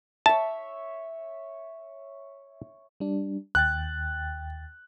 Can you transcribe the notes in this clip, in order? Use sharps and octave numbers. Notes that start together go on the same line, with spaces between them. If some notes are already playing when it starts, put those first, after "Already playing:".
C#5 E5 A5
G3 D4
D#2 G5 F#6 A6